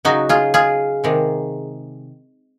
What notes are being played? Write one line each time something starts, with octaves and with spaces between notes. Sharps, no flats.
C#3 F#3 D#4 F#4
F4 G#4
F4 G#4
C3 D#3 G#3